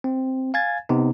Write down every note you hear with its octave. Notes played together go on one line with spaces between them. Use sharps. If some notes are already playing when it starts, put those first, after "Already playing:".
C4
F5 G#5 G#6 A6
C3 B3 C4 D#4